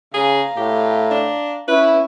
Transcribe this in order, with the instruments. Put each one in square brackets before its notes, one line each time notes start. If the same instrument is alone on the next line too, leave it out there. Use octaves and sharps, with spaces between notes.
[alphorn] C#3 [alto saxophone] G#4 [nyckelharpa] F5 A#5
[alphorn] A2 [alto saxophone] G4
[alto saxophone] D4
[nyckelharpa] C#4 [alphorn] E4 [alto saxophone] B4